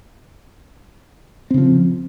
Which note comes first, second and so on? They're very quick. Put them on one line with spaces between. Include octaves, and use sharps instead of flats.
C4 C#3 F3